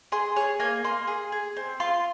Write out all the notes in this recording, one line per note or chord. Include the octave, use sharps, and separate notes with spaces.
G#4 C6
G#4 C#5
A#3 G#5
A#3 C6
G#4
G#4
C4
F4 C6